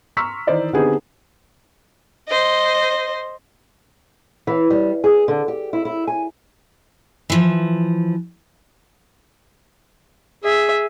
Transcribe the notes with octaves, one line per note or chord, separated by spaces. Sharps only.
A#5 C6 C#6 E6 F6 B6
D#3 E3 D#4 C5 D5 D#5
D3 B3 C4 D#4 G4 G#4
C5 D#5
E3
G3
G#4
D3
G4
E4
E4
G#5
E3 F3
G#4 E5